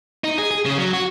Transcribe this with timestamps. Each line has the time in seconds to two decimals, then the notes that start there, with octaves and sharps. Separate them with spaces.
0.24 D#4
0.38 G#4
0.51 G#4
0.66 C#3
0.78 F#3
0.93 F#4